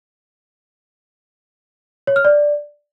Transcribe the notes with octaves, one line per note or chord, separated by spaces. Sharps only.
C#5
F6
D5